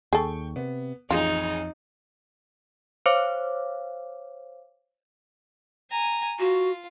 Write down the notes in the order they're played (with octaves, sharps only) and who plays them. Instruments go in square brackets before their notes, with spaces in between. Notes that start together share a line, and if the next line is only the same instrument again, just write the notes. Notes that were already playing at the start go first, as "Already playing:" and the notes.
[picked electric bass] D#2 [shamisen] G#4 A4 [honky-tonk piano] G5 C#6
[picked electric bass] C3 [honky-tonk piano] B3
[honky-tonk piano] A1 G#4 [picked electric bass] F2 [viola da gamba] D#4 [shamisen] F4
[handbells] C5 C#5 F5 D6
[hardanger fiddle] G#5 A#5
[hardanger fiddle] F4 [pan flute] F#4